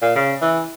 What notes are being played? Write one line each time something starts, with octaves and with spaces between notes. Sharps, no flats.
A#2
C#3
E3